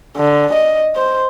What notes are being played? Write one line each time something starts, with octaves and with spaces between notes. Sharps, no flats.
D3
D#5
C5